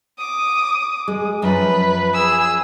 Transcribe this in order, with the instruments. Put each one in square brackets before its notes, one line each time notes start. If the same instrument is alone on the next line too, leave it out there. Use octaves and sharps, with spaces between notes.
[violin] D6 D#6
[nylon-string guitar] G#3
[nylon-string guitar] F#2 F3 [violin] B4
[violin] G#4 E6